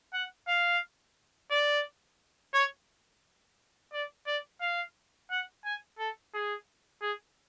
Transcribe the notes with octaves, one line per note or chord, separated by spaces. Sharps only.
F#5
F5
D5
C#5
D5
D5
F5
F#5
G#5
A4
G#4
G#4